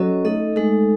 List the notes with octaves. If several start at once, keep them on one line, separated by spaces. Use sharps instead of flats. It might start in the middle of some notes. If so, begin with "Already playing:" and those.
Already playing: F#3 C#4 F#4 A4 D#5
A3 D#4 A4 D#5
G#3 A3 D#4 A4